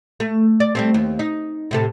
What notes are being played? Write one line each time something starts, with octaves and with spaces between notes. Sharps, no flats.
A3
D5
G3 A3 C4
D#2
D#4
A2 C3 A4